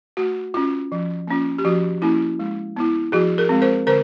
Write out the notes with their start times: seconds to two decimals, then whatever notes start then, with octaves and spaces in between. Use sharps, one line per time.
0.17 A3 F#4
0.54 C#4 F4
0.92 F3
1.27 A#3 C#4 F4
1.58 G4
1.65 F3 F#4
2.02 A#3 C#4 E4
2.39 G#3
2.76 B3 E4
3.12 F3 F#4 G#4
3.38 G#4 A#4
3.49 G#3 C4
3.62 A#4 C5
3.87 D3 A#4 C5